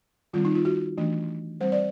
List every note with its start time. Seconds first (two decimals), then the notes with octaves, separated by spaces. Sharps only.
0.33 D#3 G3 C4 F4
0.45 D#4
0.55 F4
0.65 F#4
0.97 E3 A3 D4
1.61 G3 C4 C5
1.72 D5